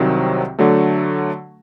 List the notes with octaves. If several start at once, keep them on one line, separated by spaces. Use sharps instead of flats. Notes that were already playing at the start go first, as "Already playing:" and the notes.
Already playing: C2 C3 D#3 F#3 C4
D3 F#3 A3